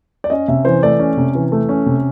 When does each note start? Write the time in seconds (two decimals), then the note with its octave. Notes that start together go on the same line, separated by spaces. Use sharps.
0.24 D5
0.30 C#4 D#5
0.48 C3 E5
0.65 E3 C5
0.82 A3 D5
1.00 C#4
1.17 C3
1.35 E3
1.52 A3
1.69 C#4
1.86 C3